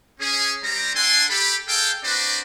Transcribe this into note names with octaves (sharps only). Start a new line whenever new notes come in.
C#4 G#4
G3 C4 A#5
D4 A4 F#5 G#5 C6
G4 A4 B5
G#4 A4 F5 G5
C4 D4 F#4 B4 C5 D5